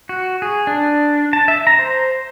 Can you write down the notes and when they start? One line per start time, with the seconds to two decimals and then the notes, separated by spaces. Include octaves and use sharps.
0.09 F#4
0.42 G#4
0.67 D4
1.33 A5
1.48 E5
1.67 A#5
1.79 C5